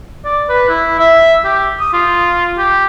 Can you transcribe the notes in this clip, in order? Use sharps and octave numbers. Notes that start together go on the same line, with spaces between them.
D5
B4
E4
E5
G4
D#6
F4
G4